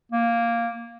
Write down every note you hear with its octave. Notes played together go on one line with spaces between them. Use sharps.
A#3